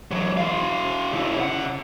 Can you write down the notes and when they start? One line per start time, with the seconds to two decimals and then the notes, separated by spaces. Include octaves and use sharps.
0.11 E3 F#3
0.37 F#4 F5
1.13 C#3 E4
1.37 C#3 F#5